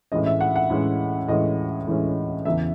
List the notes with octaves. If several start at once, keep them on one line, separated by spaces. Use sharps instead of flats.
A2 E3 G#3 C#4 D#5
E5
F#5
F#5
A2 E3 G#3 C#4
A2 E3 G#3 C#4 D#5
A2 E3 G#3 C#4
E2 C#3 E3 E5